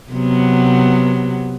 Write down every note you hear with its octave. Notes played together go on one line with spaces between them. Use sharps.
C3 F#3 B3